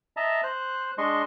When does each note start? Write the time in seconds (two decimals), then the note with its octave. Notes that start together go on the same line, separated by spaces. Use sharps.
0.17 D#5 E5 A5 A#5
0.43 C5 F#6
0.98 G#3 D4 D#5 C6 C#6